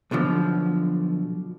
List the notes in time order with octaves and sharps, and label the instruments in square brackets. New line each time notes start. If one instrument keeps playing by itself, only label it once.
[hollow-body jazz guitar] B1 B2 D3 F3